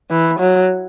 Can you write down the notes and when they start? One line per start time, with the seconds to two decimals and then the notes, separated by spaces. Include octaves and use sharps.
0.11 E3
0.40 F#3